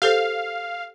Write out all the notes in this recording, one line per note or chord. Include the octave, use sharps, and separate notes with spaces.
G4 A4 C5 F5